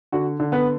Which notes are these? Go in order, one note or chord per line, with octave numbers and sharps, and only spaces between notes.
D3 F#4
D3
B3 B4